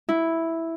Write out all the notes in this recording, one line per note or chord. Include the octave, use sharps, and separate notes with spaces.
E4